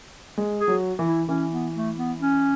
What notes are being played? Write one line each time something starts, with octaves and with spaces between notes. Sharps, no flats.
G#3
G#4
F#3
E3
E4
E3 C#4
B3
A3
B3
C#4